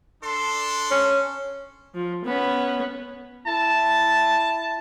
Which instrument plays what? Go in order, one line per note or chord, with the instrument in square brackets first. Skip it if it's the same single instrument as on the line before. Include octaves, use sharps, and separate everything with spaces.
[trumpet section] D4 A4 C6
[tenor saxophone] C#4
[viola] F3
B3 C#4
[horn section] E4 A5